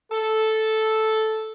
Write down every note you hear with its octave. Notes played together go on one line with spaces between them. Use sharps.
A4